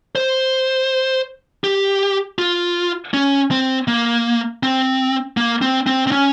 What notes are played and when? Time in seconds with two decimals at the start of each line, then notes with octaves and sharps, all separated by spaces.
0.16 C5
1.64 G4
2.39 F4
3.14 C#4
3.51 C4
3.88 A#3
4.63 C4
5.37 A#3
5.62 C4
5.87 C4
6.07 C4
6.12 C#4